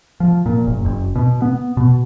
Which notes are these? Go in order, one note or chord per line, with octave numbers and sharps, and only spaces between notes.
F3
A#2
F#1
F#1
B2
B3
B2